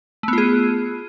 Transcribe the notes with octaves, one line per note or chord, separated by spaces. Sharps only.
A3 B3 F4 G#4